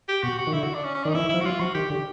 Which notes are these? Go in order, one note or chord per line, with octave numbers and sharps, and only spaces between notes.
G4
B2 F#4
F#4
D#3
D3 E4
F#4
D4
C#4
C#4
D#3 D4
D#4
E3 E4
E3
E4
F3
F#4
F#3 F4
F3 F#4
D#3 G4
D3 G4